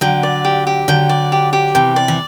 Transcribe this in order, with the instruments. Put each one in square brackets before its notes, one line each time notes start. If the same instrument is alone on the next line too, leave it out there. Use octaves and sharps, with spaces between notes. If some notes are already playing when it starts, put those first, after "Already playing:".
[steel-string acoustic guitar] D3 F#3 [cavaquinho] G5
[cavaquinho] D5
G4
G4
[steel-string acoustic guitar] D3 F#3 [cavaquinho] G5
[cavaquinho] D5
G4
G4
[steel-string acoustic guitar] C3 E3 [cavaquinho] G5
[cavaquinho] D5
[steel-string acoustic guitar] E3